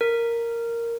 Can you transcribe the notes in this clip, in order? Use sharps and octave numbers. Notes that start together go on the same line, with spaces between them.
A#4